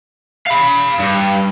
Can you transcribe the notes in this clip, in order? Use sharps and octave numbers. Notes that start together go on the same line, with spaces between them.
F5 B5
G2